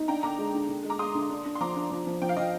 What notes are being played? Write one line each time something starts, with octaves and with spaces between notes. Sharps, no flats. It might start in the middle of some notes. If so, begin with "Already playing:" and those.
Already playing: D#4
D4 G5 A#5
D3 A#5 D6
G#3
D3
D3
G#3
A#5 D6
G#3 C6 D#6
D3
D4
D4
C6
F3 A#5 D6
D4
F3
F3
F3 G5
F5
F3 D#5